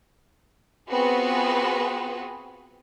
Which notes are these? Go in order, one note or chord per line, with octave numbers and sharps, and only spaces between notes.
B3 C4 F4 F#4 G#4 B4